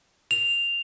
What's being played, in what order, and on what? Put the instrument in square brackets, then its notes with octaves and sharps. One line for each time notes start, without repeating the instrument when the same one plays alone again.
[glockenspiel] F7